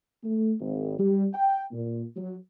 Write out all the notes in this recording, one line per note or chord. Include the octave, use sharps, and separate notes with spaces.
A3
G#1
G3
G5
A#2
F#3